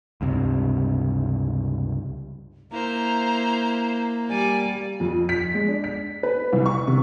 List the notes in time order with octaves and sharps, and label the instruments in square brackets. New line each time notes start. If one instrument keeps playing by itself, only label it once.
[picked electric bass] C#2 G2 C3
[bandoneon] A#3 [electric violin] E4 C5 [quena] A#5
[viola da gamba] G3 [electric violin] D5 [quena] G#5
[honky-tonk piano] F2
B6
G#3
D4
B6
B4
C2
C#6
C3